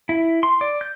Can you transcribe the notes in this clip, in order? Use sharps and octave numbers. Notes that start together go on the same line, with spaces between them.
E4
C6
D5
G6